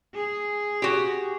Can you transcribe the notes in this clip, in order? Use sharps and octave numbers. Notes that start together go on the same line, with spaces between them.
G#4
F#4 G4